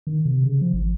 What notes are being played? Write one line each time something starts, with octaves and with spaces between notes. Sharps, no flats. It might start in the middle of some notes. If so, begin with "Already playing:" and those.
D#3
C3
C#3
F3
G#1